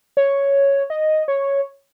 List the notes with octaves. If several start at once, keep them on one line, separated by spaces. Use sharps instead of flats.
C#5
D#5
C#5